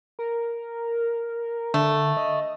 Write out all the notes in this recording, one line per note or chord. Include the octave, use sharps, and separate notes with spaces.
A#4
D3 A3
D#5